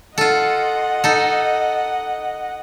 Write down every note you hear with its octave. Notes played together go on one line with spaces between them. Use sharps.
F4 A4 D#5 F#5
D#4 A4